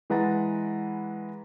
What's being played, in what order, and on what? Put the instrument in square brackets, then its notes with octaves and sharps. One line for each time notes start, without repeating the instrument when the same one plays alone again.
[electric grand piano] E3 G#3 B4 F#5 A#5 A6